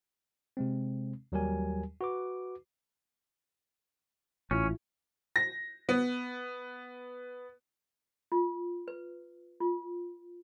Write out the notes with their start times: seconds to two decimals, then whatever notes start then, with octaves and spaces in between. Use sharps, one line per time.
0.57 C3 G#3 C4
1.32 D#2 F#3 G3 G4 A#4 G#5
2.01 F#4 B4 D6
4.51 A1 G#2 C#4 E4 F4
5.36 A#6
5.89 B3
8.32 F4
8.88 B4
9.60 F4